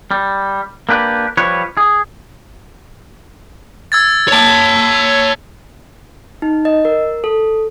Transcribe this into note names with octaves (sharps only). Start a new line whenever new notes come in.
G3
A#3 D4 G4 B4
F3 G3 B4 C#5
G#4
E6 G#6 A6
C#5 A5
D#4
D#5
A#4
A4